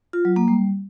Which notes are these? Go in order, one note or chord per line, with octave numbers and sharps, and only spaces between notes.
F4
F#3
A#3
G3